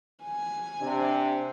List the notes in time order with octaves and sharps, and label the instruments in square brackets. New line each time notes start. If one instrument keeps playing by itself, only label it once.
[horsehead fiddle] G#5
[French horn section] C3 D4